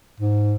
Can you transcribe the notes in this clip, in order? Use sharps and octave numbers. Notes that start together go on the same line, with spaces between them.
G#2